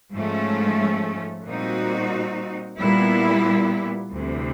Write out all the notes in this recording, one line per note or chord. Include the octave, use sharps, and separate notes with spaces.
G#2 F3 A3 C#4
A#2 G3 C4 D#4 F#4
A#2 G3 B3 E4
D2 C3 E3